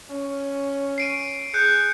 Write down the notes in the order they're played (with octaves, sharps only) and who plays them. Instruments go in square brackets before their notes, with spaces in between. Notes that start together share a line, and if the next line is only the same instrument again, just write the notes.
[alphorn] C#4
[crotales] C7 D7 D#7
[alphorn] G#4 [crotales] F#6 G6 C#7